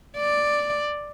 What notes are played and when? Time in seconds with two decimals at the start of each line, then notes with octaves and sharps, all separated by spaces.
0.17 D5